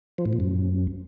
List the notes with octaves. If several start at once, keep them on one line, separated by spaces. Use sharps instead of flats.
F3
A2
A#2
F#2